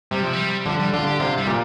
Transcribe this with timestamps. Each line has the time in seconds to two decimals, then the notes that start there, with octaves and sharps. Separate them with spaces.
0.11 C3 G3
0.22 F3
0.33 G3
0.66 D3 F3
0.79 G3
0.93 D3 F4
1.07 G4
1.20 C3 F4
1.38 G3
1.47 A#2